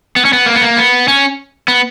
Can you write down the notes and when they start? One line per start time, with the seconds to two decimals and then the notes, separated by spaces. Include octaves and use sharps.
0.16 B3
0.25 C#4
0.33 B3
0.46 A#3
0.55 B3
0.62 A#3
0.77 B3
1.08 C#4
1.68 B3